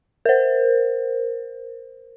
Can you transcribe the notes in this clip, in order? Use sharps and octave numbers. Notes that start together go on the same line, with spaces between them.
A#4 C5